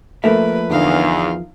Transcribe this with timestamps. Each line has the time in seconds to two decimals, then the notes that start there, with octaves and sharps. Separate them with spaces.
0.24 F3 A3 A#3 A#4 B4 E5
0.70 E2 D3 D#4 F5